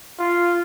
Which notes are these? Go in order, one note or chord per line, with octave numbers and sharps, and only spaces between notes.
F4